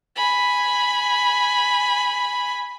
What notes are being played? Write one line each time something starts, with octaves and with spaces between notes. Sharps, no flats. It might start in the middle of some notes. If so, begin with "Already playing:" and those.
G#5 B5